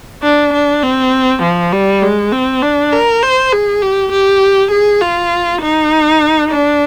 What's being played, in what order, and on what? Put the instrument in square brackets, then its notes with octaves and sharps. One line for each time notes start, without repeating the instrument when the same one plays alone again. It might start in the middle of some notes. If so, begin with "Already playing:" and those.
[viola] D4
D4
C4
F3
G3
G#3
C4
D4
A#4
C5
G#4
G4
G4
G#4
F4
D#4
D4